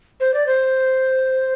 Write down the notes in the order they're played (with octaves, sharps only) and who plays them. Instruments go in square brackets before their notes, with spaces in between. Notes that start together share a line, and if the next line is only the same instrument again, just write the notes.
[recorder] C5
D5
C5